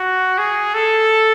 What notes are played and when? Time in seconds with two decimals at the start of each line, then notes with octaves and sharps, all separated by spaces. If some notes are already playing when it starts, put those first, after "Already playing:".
Already playing: F#4
0.38 G#4
0.74 A4